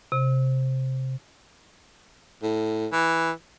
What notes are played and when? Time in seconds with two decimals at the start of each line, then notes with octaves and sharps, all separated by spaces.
0.12 C3
2.42 A2
2.92 E3